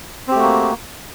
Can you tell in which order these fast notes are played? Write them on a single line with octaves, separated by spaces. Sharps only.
C4 G4 A3 F#4 A#3